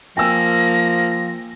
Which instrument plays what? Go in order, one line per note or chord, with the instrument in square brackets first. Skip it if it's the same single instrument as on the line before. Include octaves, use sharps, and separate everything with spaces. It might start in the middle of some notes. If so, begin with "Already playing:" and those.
[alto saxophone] F3 [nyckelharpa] A#3 [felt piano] G5 G#5 E6 [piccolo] A#6